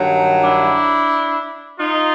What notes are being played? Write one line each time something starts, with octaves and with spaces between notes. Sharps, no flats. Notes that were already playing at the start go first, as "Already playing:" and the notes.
Already playing: G2 D#3 F#3
D4 E4
D#4 F4